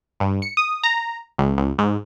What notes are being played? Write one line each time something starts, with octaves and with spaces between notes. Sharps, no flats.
G2
C#7
D#6
A#5
C#2
C#2
G#2